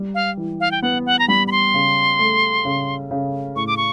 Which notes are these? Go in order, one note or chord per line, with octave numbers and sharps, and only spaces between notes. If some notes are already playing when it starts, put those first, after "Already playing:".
Already playing: G3
F5
E3
F5
G5
B3 F#5
F#5
A#5
G3 B5
B5
C6
C#3
A3
C#3
C#3
A2 C#6
D6
C#6